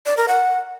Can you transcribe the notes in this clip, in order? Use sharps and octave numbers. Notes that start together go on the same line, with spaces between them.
D5
A#4
F#5